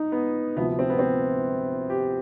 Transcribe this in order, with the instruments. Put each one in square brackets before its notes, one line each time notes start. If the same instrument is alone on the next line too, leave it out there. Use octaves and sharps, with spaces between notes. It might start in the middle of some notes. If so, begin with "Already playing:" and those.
Already playing: [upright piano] D#4
B3
D2 C3 F3 B3
C4
B3
C4
G4